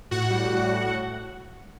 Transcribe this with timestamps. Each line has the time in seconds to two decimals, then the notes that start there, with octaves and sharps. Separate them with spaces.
0.11 A2 F#4 F#5
0.31 G3
0.50 A2
0.71 A2